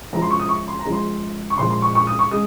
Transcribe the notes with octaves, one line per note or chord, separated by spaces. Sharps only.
F#2 F3 G#3 A#5
C6
C#6
D#6
C#6
C6
A#5
F#2 F3 G#3
C6
C#6
A#2 F3 G#3 C6
C6
C#6
C#6
D#6
C#6
G#3 D#6